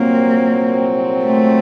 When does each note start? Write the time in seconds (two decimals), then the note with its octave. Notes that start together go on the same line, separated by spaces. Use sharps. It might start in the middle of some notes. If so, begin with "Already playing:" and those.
Already playing: C2 A#2 F#3 A#3 C4
1.24 A3